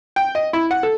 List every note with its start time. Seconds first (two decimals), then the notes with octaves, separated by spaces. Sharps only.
0.16 G5
0.35 D#5
0.53 E4
0.71 F#5
0.83 A4